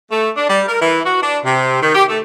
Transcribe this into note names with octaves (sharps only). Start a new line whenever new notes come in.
A3
D4
G3
A#4
E3
F#4
D4
C3
D#3
G4
A3